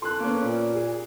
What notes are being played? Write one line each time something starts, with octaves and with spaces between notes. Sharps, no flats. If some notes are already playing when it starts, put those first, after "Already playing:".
A4 C6 F#6
A#3 B3 C#4
A#2
G#4